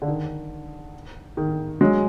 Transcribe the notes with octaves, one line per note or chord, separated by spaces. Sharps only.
D3
D#3
D#3
F#3 G#3